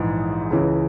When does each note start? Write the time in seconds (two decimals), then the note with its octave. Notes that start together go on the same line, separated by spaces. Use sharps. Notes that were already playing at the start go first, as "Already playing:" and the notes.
Already playing: A#1 G#2 E3
0.50 C#2 C#3 E3